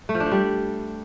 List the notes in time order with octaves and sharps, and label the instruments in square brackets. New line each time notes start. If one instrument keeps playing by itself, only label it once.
[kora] A3
F3
D4
F3
G3